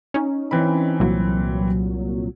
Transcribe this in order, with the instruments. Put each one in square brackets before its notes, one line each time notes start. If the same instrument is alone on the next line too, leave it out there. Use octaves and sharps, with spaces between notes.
[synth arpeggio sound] C#4 D#4
[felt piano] E3 C4 B5
[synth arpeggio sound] C2 A#2 F#3